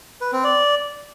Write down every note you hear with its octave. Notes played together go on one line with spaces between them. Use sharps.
B4
C4
D5